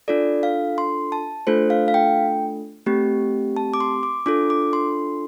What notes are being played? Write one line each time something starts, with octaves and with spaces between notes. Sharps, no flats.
D4 F4 A4 D5
F5
C6
A5
A3 D4 F4 A4 C5
F5
F5
G5
A3 C4 G4
A5
D6
C6
D6
D4 F4 A4 D6
D6
C6